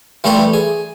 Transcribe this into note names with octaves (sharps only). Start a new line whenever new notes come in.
E3 G3 A3 A4 C6
G#4